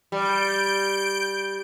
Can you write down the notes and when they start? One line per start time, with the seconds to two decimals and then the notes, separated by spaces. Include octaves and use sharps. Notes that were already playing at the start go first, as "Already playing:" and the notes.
0.12 G3 G6 D7